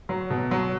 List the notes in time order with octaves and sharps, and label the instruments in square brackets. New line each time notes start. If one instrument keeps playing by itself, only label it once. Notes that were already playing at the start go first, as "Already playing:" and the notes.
[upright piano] F#3
B2
F#3